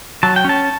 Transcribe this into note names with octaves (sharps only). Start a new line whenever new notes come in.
F#3 A5
G5
C#4 A5